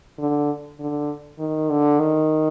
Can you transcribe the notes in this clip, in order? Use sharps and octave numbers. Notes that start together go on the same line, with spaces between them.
D3
D3
D#3
D3
D#3